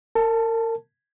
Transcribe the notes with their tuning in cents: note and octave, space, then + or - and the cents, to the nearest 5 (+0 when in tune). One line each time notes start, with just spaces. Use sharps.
A#4 -35 A5 +0